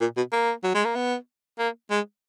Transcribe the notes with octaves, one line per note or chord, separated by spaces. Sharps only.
A#2
B2
A#3
F#3
G#3
A#3
B3
A#3
G#3